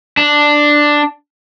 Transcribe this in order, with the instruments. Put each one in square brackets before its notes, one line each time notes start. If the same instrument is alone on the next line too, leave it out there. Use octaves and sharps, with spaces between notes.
[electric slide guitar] D4